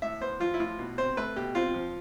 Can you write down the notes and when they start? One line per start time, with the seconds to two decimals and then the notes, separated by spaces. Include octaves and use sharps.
0.02 A2 E5
0.21 B3 C5
0.40 F3 F4
0.54 E4
0.59 A2 F4
0.79 B2
0.98 C4 C5
1.17 A3 B4
1.36 B2 G4
1.55 C4 F4
1.74 F3